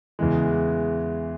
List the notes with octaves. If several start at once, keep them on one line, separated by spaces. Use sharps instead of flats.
E2 C#3 E3 G#3